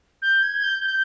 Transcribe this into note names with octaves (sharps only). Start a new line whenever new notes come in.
G6
G#6
G6
G6